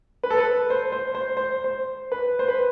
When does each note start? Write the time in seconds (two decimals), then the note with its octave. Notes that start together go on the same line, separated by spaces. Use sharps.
0.23 B4
0.31 A4
0.38 B4
0.70 C5
0.92 C5
1.15 C5
1.37 C5
1.64 C5
2.12 B4
2.39 C5
2.49 B4